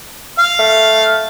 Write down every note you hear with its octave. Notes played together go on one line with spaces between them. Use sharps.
F5 F6
A3